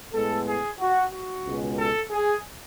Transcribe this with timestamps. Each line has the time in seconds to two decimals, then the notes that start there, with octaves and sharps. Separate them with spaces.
0.13 A2 G#3 B3 A4
0.46 G#4
0.79 F#4
1.12 F#4
1.45 C#2 B2 G#3
1.78 A4
2.10 G#4